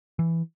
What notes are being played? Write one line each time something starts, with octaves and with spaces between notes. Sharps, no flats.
E3